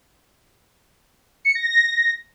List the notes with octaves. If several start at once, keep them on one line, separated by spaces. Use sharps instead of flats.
C#7
A#6
A#6